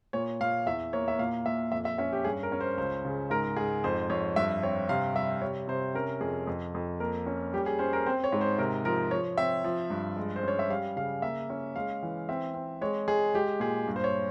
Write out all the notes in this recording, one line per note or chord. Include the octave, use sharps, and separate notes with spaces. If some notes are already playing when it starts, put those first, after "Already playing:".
A#2 C#5
A#2 F5
E2 E5
A#3 C#5
E5
A#2 F5
A#2 E5
F2 E5
E5
C#4 E5
G4
G2 G#4
A#4
C#4
C5
C#2 C5
C#3
G#2 A#4
G#2 G#4
F2 C5
F2 C#5
G2 E5
C4 C#5
C3 F5
G3 E5
C3 C#5
C3 C5
C#4 A#4
F2 G#4
F2
F2
A#3 A#4
C#4
G3 G4
G#4
C#4 C5
A#4
C4 C5
C#5
G#2
C5
C3 A#4
F3 A#4
F3 C#5
C4 E5
F3
G2
G#3
C5
C#4 C#5
E5
G3 F5
C#3 F5
A#3 E5
C#4
G#3 F5
E3
C4 E5
C4
G#3 C#5
G#3 G#4
G#3 G4
A#2 G#4
G2
C5
C#5